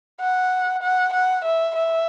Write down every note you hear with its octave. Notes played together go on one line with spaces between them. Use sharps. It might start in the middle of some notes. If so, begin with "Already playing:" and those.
F#5
F#5
F#5
E5
E5